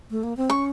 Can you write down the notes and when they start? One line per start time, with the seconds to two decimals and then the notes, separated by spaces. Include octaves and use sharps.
0.11 A3
0.23 A#3
0.37 C4
0.50 C#4 C#6